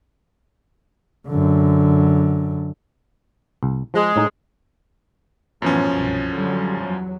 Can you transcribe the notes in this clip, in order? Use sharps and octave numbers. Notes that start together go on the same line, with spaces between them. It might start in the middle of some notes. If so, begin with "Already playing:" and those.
F#2 D3
C2
F3 G#3
A2 D#4 G#5
F#2 A2 E3 F3 B3 C#4
C2 G2 B2
D3 F#3 G3
E2 F#3